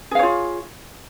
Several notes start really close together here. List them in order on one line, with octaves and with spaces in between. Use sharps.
G#4 F5 C#5 F4